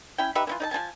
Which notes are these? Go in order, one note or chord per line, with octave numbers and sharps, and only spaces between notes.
C#4 E4 G5
D#4 G4 B4 E5
E3 C#4 F4
D#4 D5 A5
F3 D4 G#5 A5